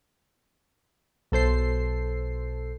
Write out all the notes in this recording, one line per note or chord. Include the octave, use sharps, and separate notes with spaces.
B1 A4 C5 C7